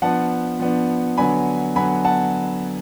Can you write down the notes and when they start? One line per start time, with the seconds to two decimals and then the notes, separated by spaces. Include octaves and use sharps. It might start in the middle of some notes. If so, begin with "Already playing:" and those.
0.02 F3 B3 D4 F#5 A5
0.59 F3 B3 D4
1.17 D3 F#3 B3 D4 G#5 B5
1.76 D3 F#3 B3 D4 G#5 B5
2.05 F#5 A5